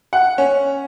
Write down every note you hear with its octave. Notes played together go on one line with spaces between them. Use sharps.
F#5
C#4